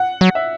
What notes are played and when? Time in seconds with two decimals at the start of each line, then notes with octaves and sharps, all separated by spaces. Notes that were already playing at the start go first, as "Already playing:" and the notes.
Already playing: F#5
0.21 F#3
0.35 E5